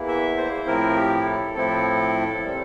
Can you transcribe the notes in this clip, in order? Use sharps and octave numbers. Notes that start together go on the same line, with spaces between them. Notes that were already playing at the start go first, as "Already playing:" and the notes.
Already playing: E2 E3 A#3 E4
E5
C5
A2 F3 C4 E4 A#4
G4
A4
A2 F3 C4 E4 A4
A#2 G3 C4